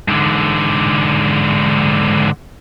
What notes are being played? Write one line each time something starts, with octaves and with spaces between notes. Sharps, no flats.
G#2 D3